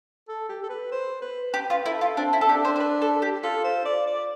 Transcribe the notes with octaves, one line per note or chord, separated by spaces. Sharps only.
A4
G4
A4
B4
C5
B4
G4 B4
F4
E4 A4
F4
C4 D4
E4
A4
D4 G4
C5
C5
B4
A4
G4
F4 A4
C5
D5
D5